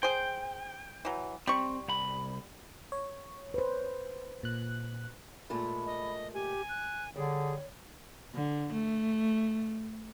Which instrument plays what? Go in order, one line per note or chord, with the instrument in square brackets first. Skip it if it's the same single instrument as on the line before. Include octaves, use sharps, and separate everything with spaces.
[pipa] G#4 C5 [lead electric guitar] G5
[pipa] E3 F#3
[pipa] G3 C#6 [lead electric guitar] C4
[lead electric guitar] C2 B5
[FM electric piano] C#5
[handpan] B4 C5
[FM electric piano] A#2 F#6
[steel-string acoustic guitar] A#2 G#3 A3 [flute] B5
[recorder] D#5
[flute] G4 [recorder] G#5
[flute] F#6
[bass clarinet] D3 [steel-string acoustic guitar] G3 [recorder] G#4 [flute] C#5
[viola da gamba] D3
A3